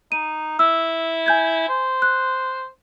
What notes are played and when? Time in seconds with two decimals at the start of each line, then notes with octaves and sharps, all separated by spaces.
0.12 D#4 D#7
0.59 E4 E6
1.26 G#5 G6 G#6
1.69 C5
2.02 F#6